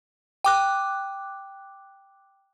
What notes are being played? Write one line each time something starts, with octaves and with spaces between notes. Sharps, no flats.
G5 D6 F#6